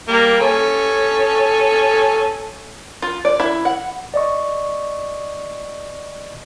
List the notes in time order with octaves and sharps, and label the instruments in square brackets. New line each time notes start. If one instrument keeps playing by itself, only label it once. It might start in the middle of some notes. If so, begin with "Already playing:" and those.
[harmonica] G3 A#3
A4 C#5 G#5
[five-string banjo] F4
D5
E4
F#5
[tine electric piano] D5 D#5 C#6